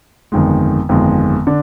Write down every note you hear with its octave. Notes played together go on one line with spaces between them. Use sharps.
G1 F2 D#3 G#3
G1 F2 D#3 G#3
D3 D4